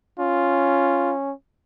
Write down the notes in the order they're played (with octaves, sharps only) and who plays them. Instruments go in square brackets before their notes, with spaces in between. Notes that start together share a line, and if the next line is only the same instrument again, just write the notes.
[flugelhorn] C#4 [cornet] F4